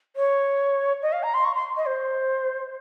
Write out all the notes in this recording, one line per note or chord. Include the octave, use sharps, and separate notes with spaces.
C#5
D#5
F5
A#5
C6
C#6
C6
D#5
C5